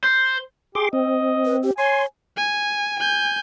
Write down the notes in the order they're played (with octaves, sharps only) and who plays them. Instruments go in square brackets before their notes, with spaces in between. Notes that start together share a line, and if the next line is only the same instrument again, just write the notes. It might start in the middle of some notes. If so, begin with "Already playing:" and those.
[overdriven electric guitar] C5
[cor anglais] G4 [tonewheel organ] G#4 C6 D6
[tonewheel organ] C4 [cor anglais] D#5
[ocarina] B4
G4
[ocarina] C#5 [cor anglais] G#5 [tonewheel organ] C6
[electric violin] G#5
G#5 G6